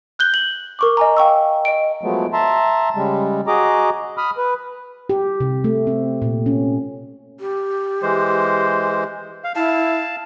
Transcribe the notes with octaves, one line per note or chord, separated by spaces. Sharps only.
F#6 G6 G7
F#7
A#4 C#6 D6
D#5 G#5 A#5
F5 G5 C#6 E6
D#5 D7
F3 F#3 G#3 A3 B3
E5 A5 A#5 C6
C#3 G3 G#3
F#4 G#4 D#5 A#5 D6
B5 D#6 F6
B4
G4
C3
A3
C4
A#2
C#4
G4
E3 G#3 C5
F5
E4 F5 A5